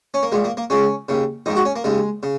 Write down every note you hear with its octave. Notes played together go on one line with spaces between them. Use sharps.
C#4
A#3
A#1 A#2 G#3
A#3
A#3
C#2 C#3 C#4
D#2 C#3
A#1 G#2 D#3 D#4
F#4
C#4
A#3
D#2 C#3 G#3
C#3